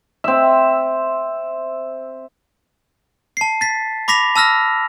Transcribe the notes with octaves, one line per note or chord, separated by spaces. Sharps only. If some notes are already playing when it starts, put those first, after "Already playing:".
C4 E5
A5 C7
A6 B6
B5 D6 A#6 B6 F7
A5 E6 F6 A#6